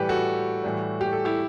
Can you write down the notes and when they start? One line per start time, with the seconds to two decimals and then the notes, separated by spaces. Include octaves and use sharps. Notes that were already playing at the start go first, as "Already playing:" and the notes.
Already playing: A2 E3 G3 G4 B4
0.09 F#4 A4
0.64 A2 E3 G3
1.01 G4
1.13 A4
1.25 E4 G4